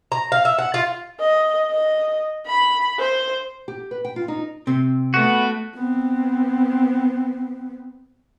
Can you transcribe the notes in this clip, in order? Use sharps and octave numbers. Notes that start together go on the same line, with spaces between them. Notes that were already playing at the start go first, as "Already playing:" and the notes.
A#5
F5
E5
F#5
F4
D#5
D#5
B5
C5
G4
B4
G5
F4
D#4
C3 C4
A3 B3 F#4
B3 C4